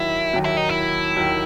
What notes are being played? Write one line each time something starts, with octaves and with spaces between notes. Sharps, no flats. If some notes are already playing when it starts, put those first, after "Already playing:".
Already playing: D#2 D#3 F#3 E4
D#2 D#3 F#3
E4
D#4
E4
D#2 D#3 F#3